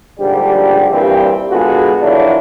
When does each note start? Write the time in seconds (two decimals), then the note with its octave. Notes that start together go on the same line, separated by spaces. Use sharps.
0.20 A#1 G#2 D3 F3 G3 G4
0.91 G2 A#2 E3 G3 C4 G4
1.51 D3 G#3 B3 F4 F#4 G#4
2.01 D3 D#3 F3 F#3 D4 E4